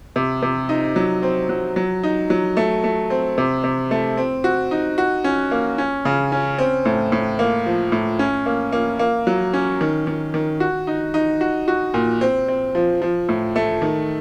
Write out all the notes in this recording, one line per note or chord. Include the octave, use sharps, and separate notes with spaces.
C3
C3
D#4
F#3
C4
F#3
F#3
D#4
F#3
A3
A3
C4
C3
C3
A3
C4
F#4
D#4
F#4
C#4
A#3
C#4
C#3
C#4
C4
A2
A2
A#3
F3
A2
C#4
A#3
A#3
A#3
F#3
C#4
D#3
D#3
D#3
F#4
D#4
D#4
F#4
F#4
A#2
C4
C4
F3
F3
A2
A3
D#3